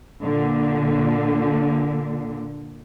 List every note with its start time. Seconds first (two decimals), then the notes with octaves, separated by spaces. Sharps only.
0.23 A#2 D3